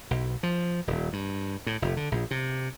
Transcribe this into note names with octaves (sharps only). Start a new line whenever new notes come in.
B1
F3
D#1
G2
A2
F1
D3
A#1
C3